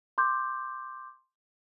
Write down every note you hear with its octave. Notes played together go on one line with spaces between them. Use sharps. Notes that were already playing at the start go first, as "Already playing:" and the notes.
C6 D6 G6